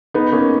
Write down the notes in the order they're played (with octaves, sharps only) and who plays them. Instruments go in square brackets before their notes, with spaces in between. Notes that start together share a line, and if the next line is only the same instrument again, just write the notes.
[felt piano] B3 D#4
A#3 C#4